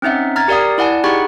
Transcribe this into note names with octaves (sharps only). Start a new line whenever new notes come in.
C4 C#4 D#4 E5 F#5
A#5 F6 G#6 A6
G4 A#4 D5 F5 D#6
E4 D5 F#5 G#5 A5
D#4 G4 G#4 F#5 B5 C#6